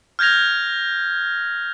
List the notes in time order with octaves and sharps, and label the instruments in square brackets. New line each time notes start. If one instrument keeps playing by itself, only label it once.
[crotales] F6 G6 G#6 A#6 F7